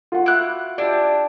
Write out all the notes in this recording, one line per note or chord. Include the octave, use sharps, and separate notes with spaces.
F4 F#4 F#5
E4 D6 F#6
D4 E4 G4 D5